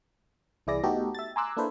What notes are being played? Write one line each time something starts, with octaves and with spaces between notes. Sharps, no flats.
C2 E3 E4 G#4 D5 A#6
A3 B3 D#4 F#4 G4 A4
E5 A6
G#5 A#5 C6 D6 E6 F#6
A#3 D4 E4 A4 B4 C5